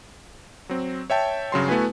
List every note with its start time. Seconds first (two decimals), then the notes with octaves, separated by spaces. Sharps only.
0.69 F#3 C4
1.10 C#5 E5 G5 A5
1.52 G2 C#3 F#3 C6
1.68 A3 B3 E4 F#4 B4 G#5